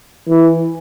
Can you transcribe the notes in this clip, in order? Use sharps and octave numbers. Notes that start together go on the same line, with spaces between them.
E3